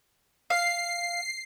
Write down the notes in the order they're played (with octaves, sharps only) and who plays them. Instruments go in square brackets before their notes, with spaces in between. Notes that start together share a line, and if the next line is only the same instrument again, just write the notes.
[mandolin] F5 [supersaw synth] C7